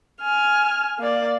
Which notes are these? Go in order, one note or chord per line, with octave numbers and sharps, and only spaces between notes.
G#5 F6
A#3 D5